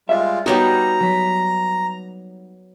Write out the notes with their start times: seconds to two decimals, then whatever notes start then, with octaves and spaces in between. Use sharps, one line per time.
0.09 G3 G#3 F4 E5
0.46 G3 B3 D#4 F#4 G4 C#5 A#5 G6
1.00 F#3 B6